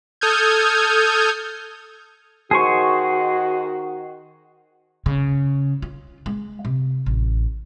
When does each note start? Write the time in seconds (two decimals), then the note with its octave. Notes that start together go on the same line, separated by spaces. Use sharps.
0.21 A4 D#6 F6 G6 G#6
2.51 D#3 F#4 G#4 C5 C#6
5.06 C#3
5.82 F4
6.26 G#3
6.65 C3
7.06 A1